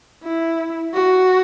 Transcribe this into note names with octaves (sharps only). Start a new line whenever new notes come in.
E4
F#4